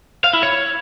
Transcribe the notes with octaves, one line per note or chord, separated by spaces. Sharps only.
F5
E4
C#5